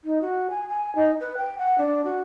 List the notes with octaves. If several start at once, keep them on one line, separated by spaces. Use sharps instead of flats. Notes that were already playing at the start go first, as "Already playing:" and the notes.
D#4
F#4
G#5
G#5
D#4
B4
G5
F#5
D4
F#4